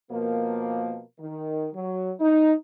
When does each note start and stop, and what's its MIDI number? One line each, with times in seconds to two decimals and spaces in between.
0.11 1.00 47
0.11 1.00 53
0.11 1.00 58
1.19 1.68 51
1.73 2.12 54
2.20 2.52 63